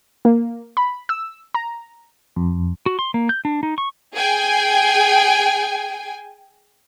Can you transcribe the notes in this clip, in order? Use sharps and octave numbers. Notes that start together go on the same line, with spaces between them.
A#3
B5
E6
A#5
F2
F#4
C6
A#3
G6
D4
D#4
C#6
G#4 G5 G#5